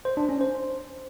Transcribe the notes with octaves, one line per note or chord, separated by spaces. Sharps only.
C5
D4
C#4
C5